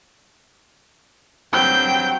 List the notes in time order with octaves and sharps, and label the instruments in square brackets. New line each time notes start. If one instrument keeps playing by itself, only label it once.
[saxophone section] G2 F#3 C4 [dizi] G5 [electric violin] G6